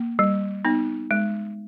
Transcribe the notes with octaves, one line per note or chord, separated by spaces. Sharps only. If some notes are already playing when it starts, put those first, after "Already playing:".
Already playing: A#3
G3
B3 D#4
G#3